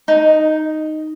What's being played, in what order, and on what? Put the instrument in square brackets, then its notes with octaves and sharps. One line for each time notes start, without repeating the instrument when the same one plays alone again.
[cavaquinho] D#4